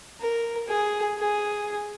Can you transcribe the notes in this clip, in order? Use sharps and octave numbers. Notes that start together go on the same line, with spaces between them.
A#4
G#4
G#4